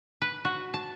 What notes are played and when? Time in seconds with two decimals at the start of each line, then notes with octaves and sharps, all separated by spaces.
0.22 B4
0.45 F#4
0.74 A5